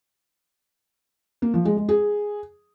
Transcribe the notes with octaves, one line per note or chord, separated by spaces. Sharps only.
A#3
F3
G#3
G#3
G#4